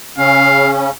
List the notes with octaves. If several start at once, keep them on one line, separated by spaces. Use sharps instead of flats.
C#3 C#4 F5